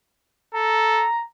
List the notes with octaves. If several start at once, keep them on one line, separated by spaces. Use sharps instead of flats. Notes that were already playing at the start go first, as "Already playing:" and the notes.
A4 A#5